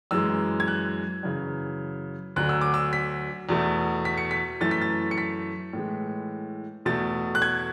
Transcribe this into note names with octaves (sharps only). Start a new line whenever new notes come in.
F#2 E3 G#3 E6
G#6
F#6
F#2 C#3 E3
D2 D3 F#3 F#6
E6
D6
E6
B6
E2 B2 A3
B6
C#7
B6
F#2 E3 A3 A6
B6
A6
C#7
B6
A2 E3 G#3
E2 B2 A3 A6
F#6
G#6